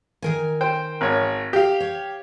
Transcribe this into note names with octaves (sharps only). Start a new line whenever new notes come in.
D#3 A#4 G#5
C5 G5
G#1 C#5
G4 F5 G5
C#5